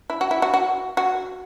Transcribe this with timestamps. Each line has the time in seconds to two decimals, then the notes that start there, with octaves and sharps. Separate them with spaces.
0.10 E4
0.21 F#4
0.31 E4
0.42 F#4
0.54 F#4
0.97 F#4